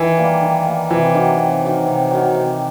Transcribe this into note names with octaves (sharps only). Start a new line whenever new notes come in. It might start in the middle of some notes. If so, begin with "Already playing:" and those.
Already playing: D#3 E3
G3 A#3
D#3
G3 A#3
C3 E3
D#3 F#3
C3
D#3 F#3
C3
D#3 F#3
C3